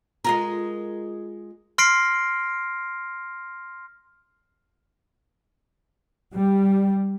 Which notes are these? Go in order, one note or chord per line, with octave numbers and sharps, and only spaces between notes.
G#3 F4 A#4
C6 F6 A#6 C7 D7
G3